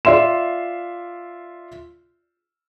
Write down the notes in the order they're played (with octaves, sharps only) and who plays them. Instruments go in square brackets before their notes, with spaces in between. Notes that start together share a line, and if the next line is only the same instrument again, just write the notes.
[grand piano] F4 D5 E5 C6 E7